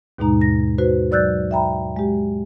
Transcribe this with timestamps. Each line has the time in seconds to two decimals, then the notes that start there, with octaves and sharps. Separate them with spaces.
0.18 D#2 G#2 B2 G#3 D#4 A#5
0.41 A#6
0.78 F#4 B4 C5
1.11 F#3 D5 E6 F#6 G6 A6
1.51 E5 G5 A#5 B5
1.96 G#3 G4